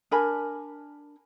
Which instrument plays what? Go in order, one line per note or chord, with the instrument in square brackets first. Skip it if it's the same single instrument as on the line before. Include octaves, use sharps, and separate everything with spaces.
[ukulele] D4 A#4 G#5 B5